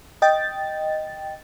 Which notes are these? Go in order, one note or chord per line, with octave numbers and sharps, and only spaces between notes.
D#5 G5 A6